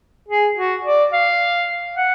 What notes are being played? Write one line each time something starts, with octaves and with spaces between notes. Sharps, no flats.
G#4
F#4
D5
F5
F#5